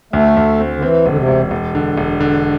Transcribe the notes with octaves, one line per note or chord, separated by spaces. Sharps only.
D2 A3
D2
C4
D3
E3 C4
E1 D3
C3
E1
E1
D3
E1
D3